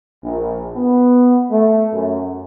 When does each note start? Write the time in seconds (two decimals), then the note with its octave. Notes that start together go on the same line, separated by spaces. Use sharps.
0.23 A#1
0.75 B3
1.50 A3
1.93 F#2